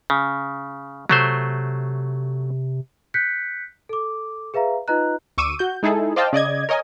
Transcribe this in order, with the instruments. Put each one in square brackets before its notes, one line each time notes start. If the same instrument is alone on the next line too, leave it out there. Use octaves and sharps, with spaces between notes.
[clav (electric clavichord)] C#3
[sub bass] C3 [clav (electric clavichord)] F#3 A3 C5
[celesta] F#6 G6 B6 C#7
A4 D6
G#4 B4 E5 F5 A#5
D#4 F4 B4 D#5 A#5 F#6
[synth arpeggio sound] D2 C#6 D6 E6 D#7
F#4 G6
G#3 D#4 E4 G#4 A4
C5 D5 D#5 F5 G5 A5
C#3 D5 D#5 G#6
A#4 C#5 D#5 G#5